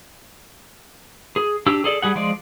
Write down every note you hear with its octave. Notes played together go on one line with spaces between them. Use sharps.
G#4
D4 G4 E6
G#4 A4 D5
G3 G#4 F#5
F3 G#3 D5